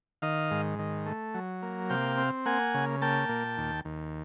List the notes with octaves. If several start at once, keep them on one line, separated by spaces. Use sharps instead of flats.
D#3 D#5 F5
G#2
D#3
A3
F#3
A#3
C3 F5 G5
C4
A#3 F#5 G#5
C#3
A#3 G5 A5
A#2
D#2
D#2